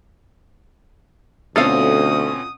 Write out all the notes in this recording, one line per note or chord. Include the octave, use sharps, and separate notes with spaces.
D2 B2 C4 C#4 F4 A4 F5 D#6